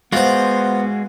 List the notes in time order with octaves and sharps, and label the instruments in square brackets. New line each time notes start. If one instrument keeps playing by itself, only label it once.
[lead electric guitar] G#3 F#4 [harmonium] B3 [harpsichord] F4 C5